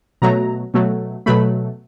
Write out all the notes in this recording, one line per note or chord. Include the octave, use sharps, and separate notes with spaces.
B2 F#3 A3 A#5
B2 F#3 A3
B2 F#3 A3 B5